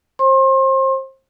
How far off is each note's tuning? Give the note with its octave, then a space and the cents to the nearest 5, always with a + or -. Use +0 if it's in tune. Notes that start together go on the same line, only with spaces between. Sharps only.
C5 +30 C6 +35